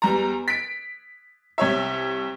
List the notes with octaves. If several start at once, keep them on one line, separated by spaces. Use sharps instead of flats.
E2 G3 A#5
B6 D7
C2 C#5 E5